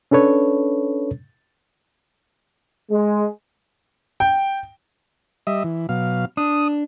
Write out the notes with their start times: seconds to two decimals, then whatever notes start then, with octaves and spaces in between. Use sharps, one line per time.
0.11 C#4 D4 A4 B4 C#5
2.90 G#3
4.20 G5
5.47 G3 D#5 E5
5.64 E3
5.89 B2 F#3 F5
6.37 D4 D#6